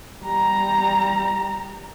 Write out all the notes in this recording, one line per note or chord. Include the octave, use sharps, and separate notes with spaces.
G3 A#5